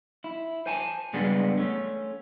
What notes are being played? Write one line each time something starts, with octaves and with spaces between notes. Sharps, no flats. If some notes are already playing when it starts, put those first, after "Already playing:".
E4
C5 G#5 A5
G2 C#3 G#3 B3 D4
A3 C#4